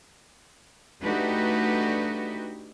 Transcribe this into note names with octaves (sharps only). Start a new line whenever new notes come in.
A3 D4 D#4 F#4 G4 B4